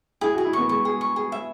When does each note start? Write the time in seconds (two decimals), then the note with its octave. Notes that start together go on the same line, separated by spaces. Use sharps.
0.21 E4 G#4
0.34 F#4 G#4
0.45 E4
0.53 B3 C#6
0.69 G#3 C#6
0.85 G#4
1.01 C#6
1.16 G#4
1.32 E5